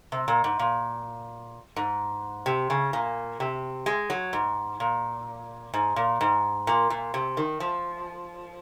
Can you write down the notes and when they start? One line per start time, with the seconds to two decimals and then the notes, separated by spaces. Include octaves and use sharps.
0.12 C3
0.28 A#2
0.44 G#2
0.59 A#2
1.76 G#2
2.46 C3
2.70 C#3
2.93 A#2
3.40 C3
3.86 G#3
4.10 F#3
4.33 G#2
4.80 A#2
5.74 G#2
5.96 A#2
6.21 G#2
6.67 A#2
6.90 A#2
7.14 C3
7.37 D#3
7.60 F3